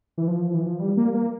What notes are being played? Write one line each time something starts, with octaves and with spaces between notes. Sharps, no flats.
E3
F3
E3
F3
G3
A#3
A#3